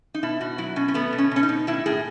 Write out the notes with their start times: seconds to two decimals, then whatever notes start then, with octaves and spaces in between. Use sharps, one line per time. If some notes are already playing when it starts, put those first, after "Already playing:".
0.14 D#4
0.23 B2 E4
0.40 B2 F#4
0.58 F#3 E4
0.76 B2 C#4
0.88 C#4
0.94 A3 B3
1.13 B2
1.18 C#4
1.31 B2 C#4
1.43 D#4
1.49 B2
1.67 A2 E4
1.86 A2 G#4